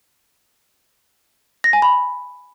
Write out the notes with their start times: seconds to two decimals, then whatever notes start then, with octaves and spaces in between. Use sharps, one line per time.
1.64 A#6
1.73 G#5
1.82 B5